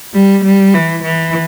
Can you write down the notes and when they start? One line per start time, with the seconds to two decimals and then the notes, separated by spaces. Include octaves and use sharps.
0.14 G3
0.44 G3
0.74 E3
1.03 E3